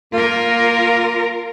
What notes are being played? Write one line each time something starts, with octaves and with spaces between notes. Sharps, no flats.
A#3 F4 A#4